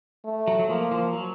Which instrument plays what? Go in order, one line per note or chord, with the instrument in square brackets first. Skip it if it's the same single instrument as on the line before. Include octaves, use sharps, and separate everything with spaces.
[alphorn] A3
[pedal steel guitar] F#3
F#3
[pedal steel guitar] F3 [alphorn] A#3
[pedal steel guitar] F3
F#3